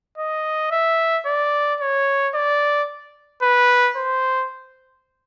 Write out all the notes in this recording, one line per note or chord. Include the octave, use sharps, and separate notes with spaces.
D#5
E5
D5
C#5
D5
B4
C5